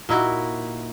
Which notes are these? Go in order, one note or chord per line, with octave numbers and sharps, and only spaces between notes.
A#2 D#4 E4 F#4